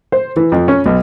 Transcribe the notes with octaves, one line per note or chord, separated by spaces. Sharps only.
C5
E3
F2
C#4
B1